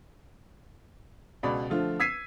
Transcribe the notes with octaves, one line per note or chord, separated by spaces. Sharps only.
C#2 B2 D5 B5
D3 F3 A3 F4
E6 G#6 B6 C7 D#7